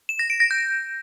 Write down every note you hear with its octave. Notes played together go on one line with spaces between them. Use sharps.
E7
A#6
D7
A#6
G6